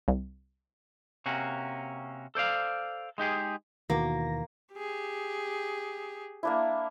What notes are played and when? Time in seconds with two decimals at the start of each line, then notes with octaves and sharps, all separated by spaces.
0.08 C2
1.26 C3 A#3 C#4 F#4
2.35 A4 C5 D5 F5
3.18 G#3 D#4 G4 G#4
3.90 D#2 B2 D#3 E3 A#3 F#4 A#6
4.74 G4 G#4
6.43 A#3 D4 E4